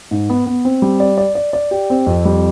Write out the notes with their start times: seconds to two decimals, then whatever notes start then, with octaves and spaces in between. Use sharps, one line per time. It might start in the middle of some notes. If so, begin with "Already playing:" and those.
0.11 G#2
0.30 B3
0.46 B3
0.65 C4
0.82 G3
1.00 D5
1.18 D5
1.35 D5
1.53 D5
1.71 G4
1.90 C4
2.07 F2
2.25 G3